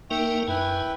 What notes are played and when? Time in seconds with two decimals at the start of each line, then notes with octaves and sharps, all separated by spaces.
0.11 A#3 D#4 A#4 E5 G5 C#6
0.48 F#2 E4 B4 G5 G#5